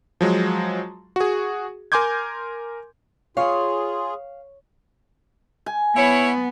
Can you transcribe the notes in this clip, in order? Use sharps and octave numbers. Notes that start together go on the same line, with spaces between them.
F3 F#3 G#3
F#4 G#4
A#4 G#5 C6 D6 G6 G#6
F4 G#4 C#5 F5
G#5
B3 E4 C#5